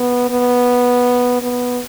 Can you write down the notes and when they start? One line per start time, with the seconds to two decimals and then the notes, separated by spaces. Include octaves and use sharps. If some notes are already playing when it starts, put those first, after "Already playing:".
Already playing: B3
0.30 B3
1.42 B3